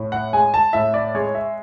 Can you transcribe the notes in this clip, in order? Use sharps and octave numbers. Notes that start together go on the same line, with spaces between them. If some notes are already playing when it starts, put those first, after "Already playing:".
Already playing: A2
F#5
G#3 G#5
A5
A2 E5
D5
G#3 C#5
E5